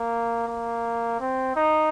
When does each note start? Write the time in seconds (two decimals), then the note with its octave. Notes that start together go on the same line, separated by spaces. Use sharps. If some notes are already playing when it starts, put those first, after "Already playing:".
Already playing: A#3
0.48 A#3
1.20 C4
1.56 D#4